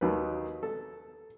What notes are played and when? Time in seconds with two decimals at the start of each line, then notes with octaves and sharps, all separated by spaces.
0.01 D#2 D#3 F#3 B4
0.63 A4